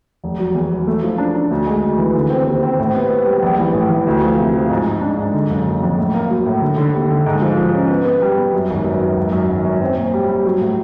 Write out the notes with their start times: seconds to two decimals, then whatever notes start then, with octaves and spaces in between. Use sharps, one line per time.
0.24 F1
0.39 F#3
0.55 E2
0.71 F#3
0.87 A3
1.03 F3
1.18 D4
1.35 D4
1.51 D2
1.66 G#3
1.82 D2
1.98 E3
2.15 D3
2.30 C4
2.47 D#2
2.63 C4
2.79 A2
2.95 B3
3.11 B3
3.26 G3
3.42 A#1
3.59 E3
3.74 A2
3.90 E3
4.07 D2
4.22 F3
4.38 C3
4.54 F3
4.69 G#2
4.86 G#2
5.01 D4
5.18 G#2
5.33 D3
5.50 F#1
5.66 F#1
5.82 F2
5.98 A2
6.14 A#3
6.30 F#3
6.46 A2
6.61 D3
6.77 D3
6.94 D#2
7.10 D3
7.26 G#2
7.41 F3
7.57 F3
7.73 C#4
7.90 B3
8.05 B3
8.22 G3
8.38 B3
8.53 F#2
8.70 G#1
8.85 F#2
9.01 F#2
9.17 G#1
9.32 F#2
9.49 G#1
9.65 F#2
9.81 C4
9.97 A#2
10.13 G3
10.28 G3
10.45 F#3
10.61 A2